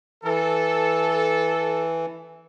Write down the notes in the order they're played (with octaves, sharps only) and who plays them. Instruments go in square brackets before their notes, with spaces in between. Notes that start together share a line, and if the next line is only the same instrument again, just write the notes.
[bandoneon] E3 [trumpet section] A4